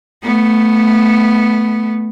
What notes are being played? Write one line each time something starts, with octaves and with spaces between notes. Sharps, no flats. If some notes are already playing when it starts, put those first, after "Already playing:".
A3 B3